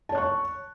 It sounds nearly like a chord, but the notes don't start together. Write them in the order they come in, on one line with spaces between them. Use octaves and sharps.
A5 C#5 F#6 C#6